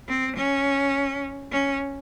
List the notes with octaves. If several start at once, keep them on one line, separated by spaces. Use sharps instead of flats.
C4
C#4
C#4